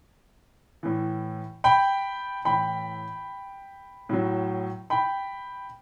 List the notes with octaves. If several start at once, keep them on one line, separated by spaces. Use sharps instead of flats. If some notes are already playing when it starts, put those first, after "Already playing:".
A2 E3
G5 B5
A2 E3 G5 B5
A2 F#3
G5 B5